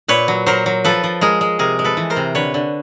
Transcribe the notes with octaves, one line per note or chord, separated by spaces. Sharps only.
A#2 B4 C#5
F#3
F#3 A#4 C5
F#3
F3 A4 B4
F3
G#3 G#4 A#4
G#3
C3 G#4 A#4
G#3
A4 B4
E3
A#4 C5
C3
D3 B4 C#5
D3